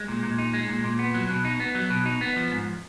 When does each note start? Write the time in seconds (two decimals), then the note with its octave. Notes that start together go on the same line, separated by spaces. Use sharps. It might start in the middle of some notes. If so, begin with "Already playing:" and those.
Already playing: G#3
0.08 A#2
0.23 A#2
0.38 D#4
0.53 G#3
0.69 A#2
0.84 A#2
0.99 B3
1.14 F#3
1.30 B2
1.45 D#4
1.60 B3
1.75 F#3
1.90 B2
2.06 D#4
2.21 B3
2.36 F3
2.52 G#2